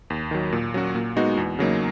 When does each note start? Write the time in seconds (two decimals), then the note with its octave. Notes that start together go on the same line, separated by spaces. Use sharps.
0.10 D#2
0.31 D#3 F#3
0.52 A#2
0.74 F#3 C#4 F#4
0.95 A#2
1.16 G#3 B3 D#4 F#4
1.37 E2
1.59 C#3 F#3 A#3 D#4